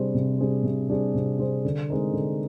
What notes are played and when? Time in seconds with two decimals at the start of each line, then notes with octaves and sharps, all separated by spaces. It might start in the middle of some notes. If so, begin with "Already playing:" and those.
Already playing: C3 G3 D4 G#4 C5
0.14 C3
0.39 G3 D4 G#4 C5
0.64 C3
0.88 G3 D4 G#4 C5
1.15 C3
1.39 G3 D4 G#4 C5
1.65 D3
1.90 G#3 C4 D#4 A#4
2.14 D3